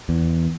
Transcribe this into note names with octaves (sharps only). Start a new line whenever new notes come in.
E2